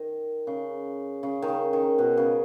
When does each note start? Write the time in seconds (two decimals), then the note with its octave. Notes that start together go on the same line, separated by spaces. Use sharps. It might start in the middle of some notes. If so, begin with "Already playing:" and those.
Already playing: D#3
0.47 C#3
1.23 C#3
1.42 D#3
1.48 C#3
1.73 D#3
1.98 B2
2.17 C#3